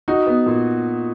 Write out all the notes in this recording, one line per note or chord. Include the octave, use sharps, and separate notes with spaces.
D#4 F#4
B3
A#2